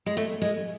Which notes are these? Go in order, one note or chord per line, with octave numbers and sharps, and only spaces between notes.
G#3
A3
G#3